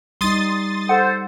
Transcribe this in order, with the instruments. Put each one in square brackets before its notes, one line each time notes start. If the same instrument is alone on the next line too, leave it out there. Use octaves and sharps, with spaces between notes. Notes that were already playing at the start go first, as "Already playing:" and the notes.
[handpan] G3 D#4 [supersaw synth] C6 D#6 A6
[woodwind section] A4 C5 [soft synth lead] F#5